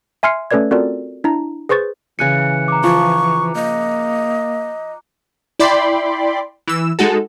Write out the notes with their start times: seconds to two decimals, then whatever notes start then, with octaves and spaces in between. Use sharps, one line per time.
0.23 E5 G#5 C6 F6 C7 C#7
0.51 A3 C#4 A4 B4 D5 G#6
0.71 C4 F4 F#4 A4 A#4 D5
1.24 D4 E4 A#5
1.69 G#4 B4 C5 C#6 A6
2.19 C#3 E3 G#5 F#6 C#7
2.68 A#5 D6
2.84 F3 C#6
3.56 A#3 D#5
5.59 E4 D5 G5 B5 C6
6.68 E3 E6
6.99 G#3 D#4 F#4 A4